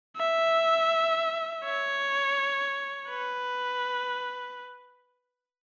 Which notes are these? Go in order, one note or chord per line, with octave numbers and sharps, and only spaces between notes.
E5
C#5
B4